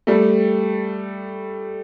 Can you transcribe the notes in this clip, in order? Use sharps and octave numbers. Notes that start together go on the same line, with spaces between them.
G3 A3